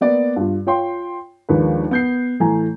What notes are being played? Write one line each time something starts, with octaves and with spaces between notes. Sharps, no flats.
A#3 B3 D5
G2 F4
F4 C#5 F5 G5 C6
D#2 F3 G#3 D4 A#4 B4
B3 G6 C7
A2 E3 A3 G#5 A#5